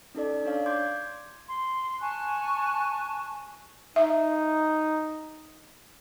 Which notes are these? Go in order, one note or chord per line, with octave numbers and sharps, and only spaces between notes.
C#4 D#4 A4 D5
D4 C#5 D5 F5
C6 D6 G6 G#6
C6
G#5 A5 C#6 F#6
D#4 E5